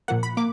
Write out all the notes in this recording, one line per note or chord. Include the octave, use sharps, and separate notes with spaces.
A#2 F3 A#3 F#5
B5
A#3 D6